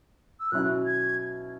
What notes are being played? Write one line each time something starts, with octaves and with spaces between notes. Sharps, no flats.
E6
B2 F#3 C#4 E4 F#6
G#6